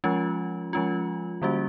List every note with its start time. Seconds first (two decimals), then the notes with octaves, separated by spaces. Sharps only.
0.04 F3 G#3 C#4 F4
0.73 F3 G#3 C#4 F4
1.42 D3 G3 A#3 C#4 F#4